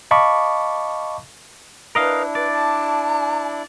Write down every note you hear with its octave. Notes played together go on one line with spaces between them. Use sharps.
D#5 F5 A5 B5 C#6 D6
D4 E4 A#4 B4 D#5 F5
B4 D5
A5